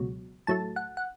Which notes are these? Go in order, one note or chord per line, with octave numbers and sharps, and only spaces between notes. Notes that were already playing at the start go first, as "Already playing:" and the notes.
Already playing: C#2 B2 F#3
A2 F#3 A3 A5
F#5
F#5